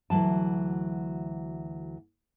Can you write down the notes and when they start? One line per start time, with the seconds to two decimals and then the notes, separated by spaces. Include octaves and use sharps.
0.10 D2 E3 F#3 A5